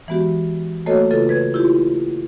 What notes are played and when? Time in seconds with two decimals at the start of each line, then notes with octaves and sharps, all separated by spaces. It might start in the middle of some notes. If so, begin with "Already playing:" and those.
0.08 E3 G#3 B3 F#4 G4
0.86 A3 A#3 F#4 A4 C#5 D#5
1.11 C#3 F4 A4 B4
1.29 B4 G#6
1.54 E4 F4 G4